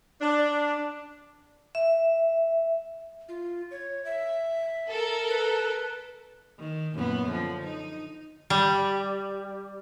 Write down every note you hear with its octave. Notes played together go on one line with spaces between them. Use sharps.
D4
E5
F4
C#5
E5
A4 A#4
B4
D#3
F#2 A#2 B3
D3 F3
D#4
G3